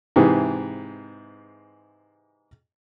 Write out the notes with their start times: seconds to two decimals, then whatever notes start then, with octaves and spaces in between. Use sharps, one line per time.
0.16 G#2 C3 E3 G#4